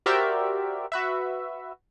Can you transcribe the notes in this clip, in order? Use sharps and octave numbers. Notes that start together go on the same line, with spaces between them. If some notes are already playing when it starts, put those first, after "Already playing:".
F#4 G4 A#4 C5 D5 E5
F#4 B4 E5